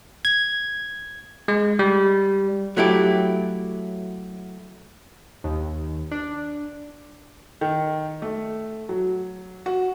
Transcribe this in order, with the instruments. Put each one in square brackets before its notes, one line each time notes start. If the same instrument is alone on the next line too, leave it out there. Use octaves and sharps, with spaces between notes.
[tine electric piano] G#6
G#3
G3
[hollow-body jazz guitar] F#3 A3 E4 G4
[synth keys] D#2
D4
[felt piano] D#3
A3
F#3
F#4